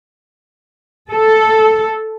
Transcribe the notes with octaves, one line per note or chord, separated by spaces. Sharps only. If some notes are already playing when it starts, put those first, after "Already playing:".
A4